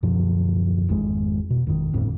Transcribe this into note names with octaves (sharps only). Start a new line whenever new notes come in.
D1 F#2 B2 F3
G#1 F2 G#3
B2
G#1 F2 D#3
G1 F2 A2